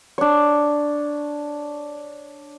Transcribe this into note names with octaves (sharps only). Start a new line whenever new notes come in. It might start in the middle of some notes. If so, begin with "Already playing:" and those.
D4 C#5